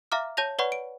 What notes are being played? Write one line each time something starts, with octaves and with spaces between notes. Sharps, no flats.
E5 F5 A#5 D6 F6
C#5 A5 G6 A#6 F7
B4 C#5 D5 F#5 B5 C#6
D7